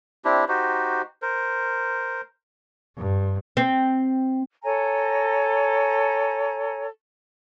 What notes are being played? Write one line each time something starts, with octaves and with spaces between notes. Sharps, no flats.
C4 D4 E4 G4
D#4 F#4 G4 C5
A#4 C5
G2
C4
A4 C#5 G#5 A#5